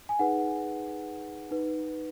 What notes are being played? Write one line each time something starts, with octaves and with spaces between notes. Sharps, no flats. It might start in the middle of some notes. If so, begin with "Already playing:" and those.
G#5
D#4 G#4 B4 F#5
D#4 B4